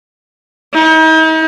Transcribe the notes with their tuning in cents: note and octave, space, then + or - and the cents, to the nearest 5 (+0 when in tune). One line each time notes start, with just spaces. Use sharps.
D#4 +40